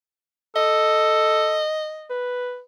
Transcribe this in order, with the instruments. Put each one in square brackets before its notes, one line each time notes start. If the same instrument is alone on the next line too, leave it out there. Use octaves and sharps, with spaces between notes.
[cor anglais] A4 [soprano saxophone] D#5
[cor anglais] B4